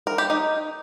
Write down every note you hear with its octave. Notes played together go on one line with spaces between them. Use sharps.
A#4
G4
D#4